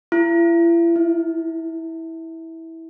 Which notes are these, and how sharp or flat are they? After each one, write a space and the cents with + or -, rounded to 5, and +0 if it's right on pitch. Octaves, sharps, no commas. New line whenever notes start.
E4 +40
E4 -15